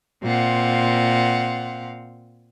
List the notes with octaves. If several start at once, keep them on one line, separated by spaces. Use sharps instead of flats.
A#2 C4 F5 F#5